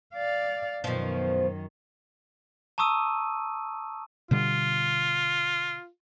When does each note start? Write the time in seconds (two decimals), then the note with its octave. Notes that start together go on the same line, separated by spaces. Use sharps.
0.14 D5 F5
0.84 F#2 B2 D#3 F3
2.78 A5 A#5 C#6 D#6 E6 D#7
4.31 B2 D3 G3 F4